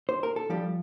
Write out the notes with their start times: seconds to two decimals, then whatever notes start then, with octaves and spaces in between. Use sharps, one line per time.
0.09 C5
0.23 A#4
0.36 A4
0.49 F3 G3 G4